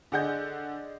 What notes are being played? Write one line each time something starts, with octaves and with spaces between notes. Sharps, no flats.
D3 G#4 D5 D#5 F#5 G6